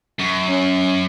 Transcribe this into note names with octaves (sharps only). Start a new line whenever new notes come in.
F#2
C#4